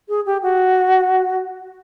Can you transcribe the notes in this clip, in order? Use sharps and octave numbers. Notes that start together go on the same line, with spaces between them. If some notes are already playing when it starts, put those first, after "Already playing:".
G#4
G4
F#4